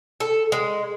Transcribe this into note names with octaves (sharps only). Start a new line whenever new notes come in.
A4
G#3